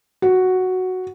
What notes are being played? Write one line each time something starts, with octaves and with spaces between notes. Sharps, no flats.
F#4